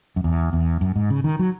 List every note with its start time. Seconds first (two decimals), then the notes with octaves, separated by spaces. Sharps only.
0.16 F#2
0.24 E2
0.53 E2
0.81 F#2
0.96 G#2
1.10 C#3
1.24 D#3
1.39 F#3